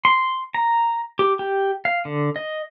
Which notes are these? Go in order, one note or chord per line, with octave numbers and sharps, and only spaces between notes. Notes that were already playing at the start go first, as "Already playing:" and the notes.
C6
A#5
G4
G4
F5
D3
D#5